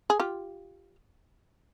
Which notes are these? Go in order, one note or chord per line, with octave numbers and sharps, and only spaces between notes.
G#4
F4 G4